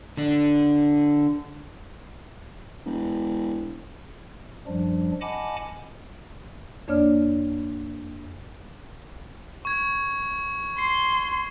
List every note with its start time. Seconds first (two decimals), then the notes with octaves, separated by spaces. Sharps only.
0.17 D3 D4
2.86 E1
4.67 F#2 F3 G3 D4
5.21 D#5 F#5 G#5 A5 B5 D6
6.88 F2 A#3 D4 C#5 D5 F6
9.65 C#6 G#6
10.79 C6 C7